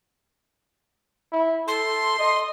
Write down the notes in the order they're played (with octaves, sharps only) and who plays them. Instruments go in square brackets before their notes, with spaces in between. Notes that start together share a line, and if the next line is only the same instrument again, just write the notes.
[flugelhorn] E4
[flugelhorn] A4 [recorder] C6
[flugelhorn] D#5